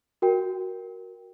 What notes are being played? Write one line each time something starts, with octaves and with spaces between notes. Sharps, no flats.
F#4 A#4 G5